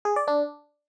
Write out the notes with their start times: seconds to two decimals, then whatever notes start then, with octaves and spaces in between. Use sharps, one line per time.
0.05 G#4
0.16 D5
0.28 D4